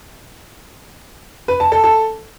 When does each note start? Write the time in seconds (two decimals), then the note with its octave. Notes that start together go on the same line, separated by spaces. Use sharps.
1.48 B4
1.60 A5
1.72 A4
1.84 A4